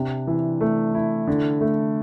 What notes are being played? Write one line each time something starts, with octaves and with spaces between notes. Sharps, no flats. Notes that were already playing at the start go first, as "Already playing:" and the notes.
Already playing: C3 D4
E3
A3
E4
D3
A3